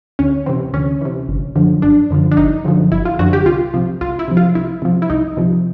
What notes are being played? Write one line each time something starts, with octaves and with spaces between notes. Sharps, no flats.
D2 C#4
C3 E3 C4
D2 C#4
C3 E3
G1
F#2 D3 F3
G1 D4
F#2 D3 F3
D4
G1 D#4
F#2 D3 F3
G1 E4
F4
F#2 D3 F3 F#4
G4
C2 F4
C3 F3
C2 F4
E4
C3 F3
F4
C2 E4
C3 F3
E4
C2 D#4
C3 F3